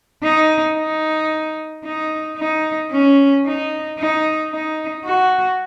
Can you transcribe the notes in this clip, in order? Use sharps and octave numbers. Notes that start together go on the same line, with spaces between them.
D#4
D#4
D#4
D#4
C#4
D#4
D#4
D#4
F#4